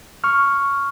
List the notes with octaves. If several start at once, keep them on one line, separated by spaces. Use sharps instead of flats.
C#6 F6